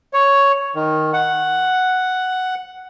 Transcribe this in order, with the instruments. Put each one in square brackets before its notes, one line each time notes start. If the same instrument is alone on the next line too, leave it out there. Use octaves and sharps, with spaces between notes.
[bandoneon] C#5
D#3
F#5